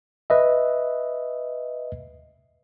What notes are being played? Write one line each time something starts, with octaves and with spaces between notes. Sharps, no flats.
B4 D#5 E5